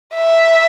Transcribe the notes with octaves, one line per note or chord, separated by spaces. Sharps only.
E5